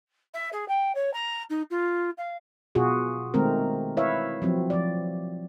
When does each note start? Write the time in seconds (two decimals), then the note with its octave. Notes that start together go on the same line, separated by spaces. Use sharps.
0.34 E5
0.52 G#4
0.68 G5
0.95 C#5
1.13 A#5
1.49 D#4
1.70 F4
2.17 F5
2.75 B2 F4 F#4 G#4
3.34 D#3 G#3 A3 C4 A#4
3.97 E4 B4 C#5 E5 F5
4.42 F3 F#3 C4
4.70 F3 D5